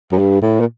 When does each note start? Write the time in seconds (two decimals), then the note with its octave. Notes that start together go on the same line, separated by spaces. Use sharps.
0.12 F#2
0.18 G2
0.42 A2
0.60 A#2